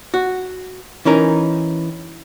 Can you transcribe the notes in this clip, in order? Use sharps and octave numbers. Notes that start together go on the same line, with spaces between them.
F#4
E3 C#4 D#4 A#4